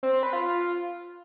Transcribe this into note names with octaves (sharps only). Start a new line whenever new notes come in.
C4
C4
B4
F4